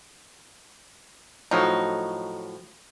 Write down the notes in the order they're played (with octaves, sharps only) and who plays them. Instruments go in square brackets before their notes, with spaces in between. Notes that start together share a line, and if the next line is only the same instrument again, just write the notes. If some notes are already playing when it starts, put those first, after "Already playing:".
[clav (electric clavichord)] A2 F3 F#3 [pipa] D#4